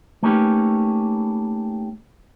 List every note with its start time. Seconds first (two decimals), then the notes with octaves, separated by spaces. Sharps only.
0.23 A3 A#3 C#4 D#4 G4 B4